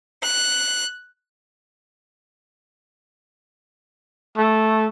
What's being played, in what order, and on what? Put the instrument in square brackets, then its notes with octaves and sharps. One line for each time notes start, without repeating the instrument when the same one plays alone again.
[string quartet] F#6
[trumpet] A3